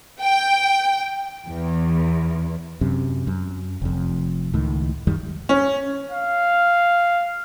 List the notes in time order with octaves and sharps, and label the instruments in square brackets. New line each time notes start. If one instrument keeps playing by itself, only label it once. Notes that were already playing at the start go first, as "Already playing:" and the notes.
[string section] G5
E2
[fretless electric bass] F#2 C3
F#2
F1 F2
C#2 A2 D#3
F#2 D#3 G3
[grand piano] C#4
[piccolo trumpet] F5